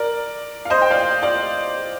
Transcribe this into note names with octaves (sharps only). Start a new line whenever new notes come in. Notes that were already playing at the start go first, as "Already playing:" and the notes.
Already playing: A#4 D5
F5
C5 D#5
G5
D5 F5
D5 F5